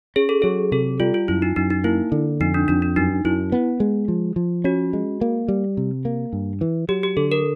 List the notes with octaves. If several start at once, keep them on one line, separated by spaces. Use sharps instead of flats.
C#4 G#4
A4
F#3 G#4
C3 A4
G3 F4
F4
F#2 E4
D#4
F#2 D#4
D#4
A#3 E4
D3
F2 D#4
D4
F2 D4
D4
F#2 D#4
F#2 E4
B3
G#3
F3
F3
C#4 F#4
G#3
A#3
G3
C3
A#3
G2
E3
F#3 G4
G4
D3 A4
A#4